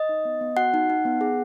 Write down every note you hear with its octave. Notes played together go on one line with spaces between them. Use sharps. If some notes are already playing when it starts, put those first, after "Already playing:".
Already playing: D#5
D#4
B3
B3
F#4 F#5
D#4
D#4
B3
G#4